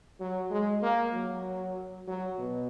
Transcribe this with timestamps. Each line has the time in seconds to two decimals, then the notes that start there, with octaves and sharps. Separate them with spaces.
0.20 F#3
0.51 G#3
0.82 A#3
1.13 F#3
2.07 F#3
2.38 B2